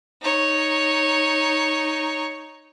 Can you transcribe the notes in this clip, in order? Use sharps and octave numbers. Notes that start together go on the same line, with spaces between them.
D#4 C#5